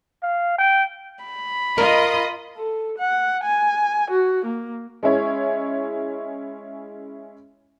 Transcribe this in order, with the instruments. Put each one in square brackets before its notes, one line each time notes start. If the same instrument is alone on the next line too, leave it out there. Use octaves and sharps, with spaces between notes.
[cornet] F5
G5
[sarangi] B5
[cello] F4 [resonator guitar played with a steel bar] A#4 [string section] D#5
[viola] A4
F#5
G#5
F#4
A#3
[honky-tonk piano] G#3 C#4 E4 C#5